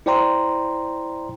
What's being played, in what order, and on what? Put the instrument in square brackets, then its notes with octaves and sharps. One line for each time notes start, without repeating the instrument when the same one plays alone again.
[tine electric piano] E4 C5 D5 G5 A#5 C6